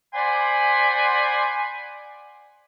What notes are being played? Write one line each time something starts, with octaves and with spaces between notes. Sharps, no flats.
C5 D5 F#5 G#5 B5 C6